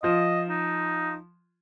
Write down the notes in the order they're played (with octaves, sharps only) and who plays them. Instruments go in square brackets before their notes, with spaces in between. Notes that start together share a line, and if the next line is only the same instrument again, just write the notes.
[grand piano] F3 F4 [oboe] D#5
[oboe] D#4